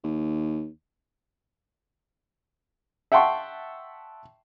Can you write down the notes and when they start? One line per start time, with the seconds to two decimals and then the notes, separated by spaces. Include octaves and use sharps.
0.04 D#2
3.12 E5 F#5 G5 A5 C6 C#6